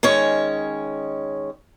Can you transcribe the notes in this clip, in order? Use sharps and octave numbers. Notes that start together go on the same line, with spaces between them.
D#3 G#3 C#4 C#5